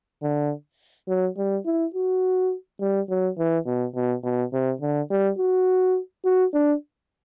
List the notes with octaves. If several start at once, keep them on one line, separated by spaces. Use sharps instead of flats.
D3
F#3
G3
E4
F#4
G3
F#3
E3
B2
B2
B2
C3
D3
G3
F#4
F#4
D4